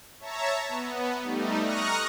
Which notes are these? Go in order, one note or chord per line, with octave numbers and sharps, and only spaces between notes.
C#5 E5 A5 A#5
B3
G3 A3 D#4
A#5 C#6 D#6 F6 F#6 A#6